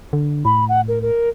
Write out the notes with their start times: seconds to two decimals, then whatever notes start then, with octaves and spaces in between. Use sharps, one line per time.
0.13 D3
0.45 A2 B5
0.69 F#5
0.88 A#4
1.02 A#4